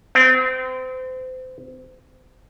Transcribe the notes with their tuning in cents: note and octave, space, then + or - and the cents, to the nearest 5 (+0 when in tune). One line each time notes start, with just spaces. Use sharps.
C4 -30